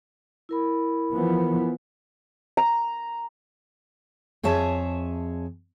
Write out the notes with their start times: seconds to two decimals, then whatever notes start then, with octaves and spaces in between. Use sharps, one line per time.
0.49 E4 A#4 B5
1.13 E3 F3 B3
2.57 A#5
4.43 F2 G#4 C#5 E5 A5